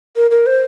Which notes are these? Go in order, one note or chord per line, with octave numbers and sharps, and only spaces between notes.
A#4
A#4
C5